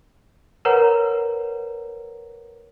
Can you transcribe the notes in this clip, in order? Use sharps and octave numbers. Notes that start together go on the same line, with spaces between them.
A#4 B4 C#5 F#5 A#5